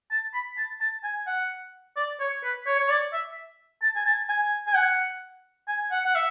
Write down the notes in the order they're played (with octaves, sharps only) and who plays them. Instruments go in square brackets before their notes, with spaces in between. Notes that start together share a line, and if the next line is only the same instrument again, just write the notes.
[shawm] A5
B5
A5
A5
G#5
F#5
D5
C#5
B4
C#5
C#5
D5
E5
A5
G#5
A5
G#5
G#5
F#5
G#5
F#5
F#5
E5